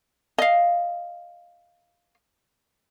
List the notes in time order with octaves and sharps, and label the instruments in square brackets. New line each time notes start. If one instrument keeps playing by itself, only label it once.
[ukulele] D#5 F5